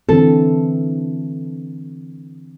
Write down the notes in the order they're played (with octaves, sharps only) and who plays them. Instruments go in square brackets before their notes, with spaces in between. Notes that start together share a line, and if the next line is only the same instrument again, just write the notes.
[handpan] D3 E3 C4 [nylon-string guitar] A4